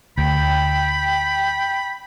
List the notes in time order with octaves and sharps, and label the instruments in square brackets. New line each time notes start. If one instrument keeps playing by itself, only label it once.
[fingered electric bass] D2 [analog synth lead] G5 [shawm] B5